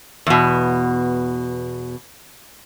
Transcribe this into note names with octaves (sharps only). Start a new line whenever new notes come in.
E2 B2